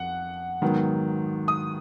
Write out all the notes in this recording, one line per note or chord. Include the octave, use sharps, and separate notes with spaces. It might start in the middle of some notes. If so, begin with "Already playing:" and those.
Already playing: F2 F#5
G#2 D#3 F#3 B3
D#6